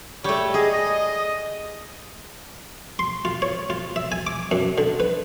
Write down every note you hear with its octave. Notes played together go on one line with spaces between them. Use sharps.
G3 A3 C#5
G#4 D#5
C6
F4
C#5
F4
E5
G#5
D6
F#2
D3
B4